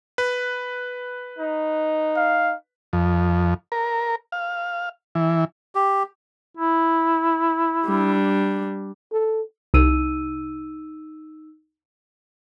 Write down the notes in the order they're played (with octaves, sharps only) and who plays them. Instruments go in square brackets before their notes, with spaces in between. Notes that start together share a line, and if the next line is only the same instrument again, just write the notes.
[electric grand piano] B4
[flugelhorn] D#4
[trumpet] F5
[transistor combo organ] F2
A#4
F5
E3
[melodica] G4
[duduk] E4
[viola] G3 D4
[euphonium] A4
[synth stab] C2 [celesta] D#4 E6 D#7